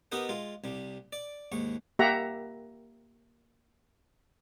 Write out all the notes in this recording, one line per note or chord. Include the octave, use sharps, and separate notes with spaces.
B3 D#4 G4 A#4 D#5 F#5
G#3 F4
C2 G3
D5
D#2 G#2 C#6
A#3 G4 E5 F#5 A#5